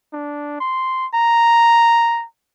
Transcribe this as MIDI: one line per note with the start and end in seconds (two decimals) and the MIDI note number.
0.13 0.57 62
0.60 1.06 84
1.14 2.25 82